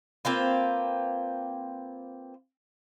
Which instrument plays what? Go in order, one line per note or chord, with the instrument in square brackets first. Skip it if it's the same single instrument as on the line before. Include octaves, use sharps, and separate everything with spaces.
[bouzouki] A#3 C4 F4 B4